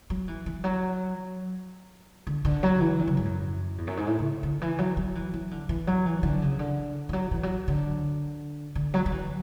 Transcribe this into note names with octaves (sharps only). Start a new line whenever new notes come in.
F#3
E3
E3
F#3
D3
D3
F#3
E3
D3
C#3
G#2
F#2
E2
F#2
G#2
A2
C#3
D3
E3
F#3
F#3
E3
E3
D3
E3
F#3
E3
D3
C#3
D3
E3
F#3
E3
F#3
D3
D3
F#3
F#3
E3